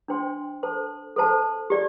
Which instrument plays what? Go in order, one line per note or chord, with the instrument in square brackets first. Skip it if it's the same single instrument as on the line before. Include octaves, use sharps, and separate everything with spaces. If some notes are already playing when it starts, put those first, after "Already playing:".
[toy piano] D4 C5 G5 C6
A4 C5 A5
A4 C5 A5
G4 D5